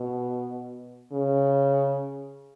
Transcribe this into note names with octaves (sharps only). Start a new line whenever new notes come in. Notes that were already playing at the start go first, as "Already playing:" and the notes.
Already playing: B2
C#3